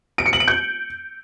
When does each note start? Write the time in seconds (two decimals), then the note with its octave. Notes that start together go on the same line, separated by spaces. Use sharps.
0.18 D7
0.26 C#7
0.33 F#7
0.40 D7
0.48 G6